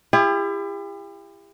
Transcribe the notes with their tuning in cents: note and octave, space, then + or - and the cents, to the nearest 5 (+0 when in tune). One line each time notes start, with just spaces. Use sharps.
E4 +35 G4 +40